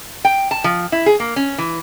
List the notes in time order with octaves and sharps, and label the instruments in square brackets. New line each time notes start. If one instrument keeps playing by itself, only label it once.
[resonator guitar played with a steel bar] G5
A5
F3
E4
G#4
A#3
C#4
E3